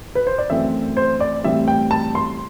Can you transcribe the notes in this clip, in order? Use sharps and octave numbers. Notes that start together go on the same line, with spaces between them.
B4
C5
D5
F#2 E3 A3 C4 E5
C5
D5
A2 E3 G3 C4 E5
G5
A5
C6